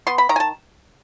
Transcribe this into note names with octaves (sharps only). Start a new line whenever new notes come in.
B3 C6
B5
D#3 A#5
G#5
A5